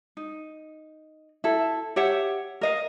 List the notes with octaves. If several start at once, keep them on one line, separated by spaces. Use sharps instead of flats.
D#4
E4 A4
G4 C#5 E5 F#5
A#4 D#5 F5